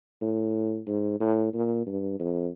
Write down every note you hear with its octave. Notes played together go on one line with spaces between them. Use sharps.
A2
G#2
A2
A#2
G2
F2